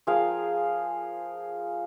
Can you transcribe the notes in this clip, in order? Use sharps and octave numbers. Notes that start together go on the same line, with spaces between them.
F3 G#4 A#4 F5